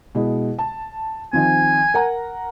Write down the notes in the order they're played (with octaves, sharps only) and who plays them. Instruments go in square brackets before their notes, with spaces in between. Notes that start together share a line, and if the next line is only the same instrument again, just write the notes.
[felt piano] B2 G#3 E4
A5
[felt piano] D#3 F3 C4 [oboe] G#5
[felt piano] A#4 F#5 A#5